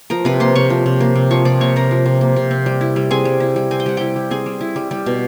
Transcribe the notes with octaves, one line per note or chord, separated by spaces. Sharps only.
F3 A#4 A#5
C3 B4 B5
A#3 C5 C6
C3 C#5 C#6
F3
C3
A#3
C3
F3 C#5 C#6
C3 D5 D6
A#3 C#5 C#6
C3 A#4 A#5
F3
C3
A#3
C3
C4
G3
E4
G3
C4 G#4 G#5
G3
E4
G3
C4 G#5
G5
G3 F#5
E4 G4 G5
G3
C4 G#4 G#5
G3
E4
G3
G3
B2